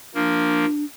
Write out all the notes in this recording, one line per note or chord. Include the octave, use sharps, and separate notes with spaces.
F3 A#3 D4